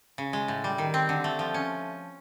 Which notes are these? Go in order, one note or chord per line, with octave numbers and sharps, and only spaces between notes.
C#3
G#3
A2
G3
D#3
C4
D3
A3
F3
C#4